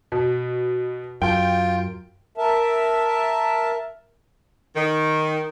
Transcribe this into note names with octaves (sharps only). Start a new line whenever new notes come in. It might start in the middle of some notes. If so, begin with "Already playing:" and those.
B2
F#2 F4 G5
A#4 E5 A5
D#3